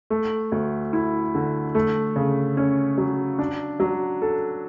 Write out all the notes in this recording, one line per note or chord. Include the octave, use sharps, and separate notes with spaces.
A3
D2
E4
D3
A3
C#3
C#4
F#3
D4
F#3
A4